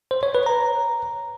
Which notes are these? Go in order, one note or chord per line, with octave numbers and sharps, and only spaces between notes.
C5
C#5
B4
A#5